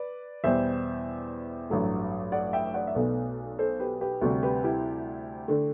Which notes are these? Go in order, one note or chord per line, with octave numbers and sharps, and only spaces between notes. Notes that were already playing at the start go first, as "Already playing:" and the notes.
Already playing: B4 D5
E2 B2 G3 C5 E5
A1 G2 F#3 A3
D5 F#5
E5 G5
D5 F#5
E5
B1 B2 A3 B4 D5
A4 C5
G4 B4
G4 B4
D2 C3 G3 F#4 A4
G4 B4
E4 G4
D3 A3